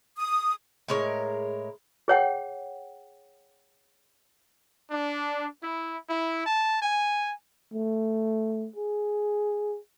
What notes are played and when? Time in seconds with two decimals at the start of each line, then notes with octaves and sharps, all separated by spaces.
0.18 D#6
0.88 A2 G#3 A#4 C#5
2.08 G#4 C#5 F#5 G5
4.91 D4
5.62 E4
6.08 E4
6.46 A5
6.82 G#5
7.73 A3
8.76 G#4